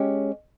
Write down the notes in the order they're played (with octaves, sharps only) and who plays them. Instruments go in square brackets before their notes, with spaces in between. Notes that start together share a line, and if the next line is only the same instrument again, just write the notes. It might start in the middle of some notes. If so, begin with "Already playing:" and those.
Already playing: [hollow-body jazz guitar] G#3 C#4 G4